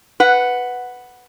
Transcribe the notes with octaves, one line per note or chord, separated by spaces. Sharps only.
B4 F#5